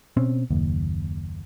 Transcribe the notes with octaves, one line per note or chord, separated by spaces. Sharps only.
B2 C4 C#4
F#1 D#2